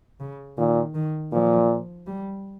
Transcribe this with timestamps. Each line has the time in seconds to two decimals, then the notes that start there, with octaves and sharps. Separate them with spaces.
0.20 C#3
0.57 A#2 D#3
0.94 D#3
1.32 A#2 F3
2.07 G3